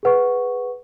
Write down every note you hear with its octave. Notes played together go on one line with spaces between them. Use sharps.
G#4 B4 F#5 C#6